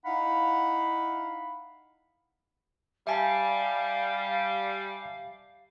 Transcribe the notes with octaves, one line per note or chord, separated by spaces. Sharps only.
D#4 E4 F5 F#5 B5
G3 E5 F5 G#5 A5